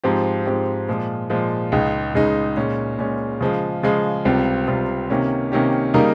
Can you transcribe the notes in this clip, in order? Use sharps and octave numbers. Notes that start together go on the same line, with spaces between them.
G#2 F3 C4 G4
G#2 F3 C4 G4
A#2 F3 G#3
A#2 F3 G#3
C#2 C#3 G#3 D#4
C#2 C#3 G#3 D#4
A#2 G#3 C#4
A#2 G#3 C#4
C#3 F3 G#3
C#3 F3 G#3
C#2 C3 G3 C4 F4
C#2 C3 G3 C4 F4
C3 D#3 A#3 C#4 G4
C3 D#3 A#3 C#4 G4
C#3 G3 A#3 D#4 A#4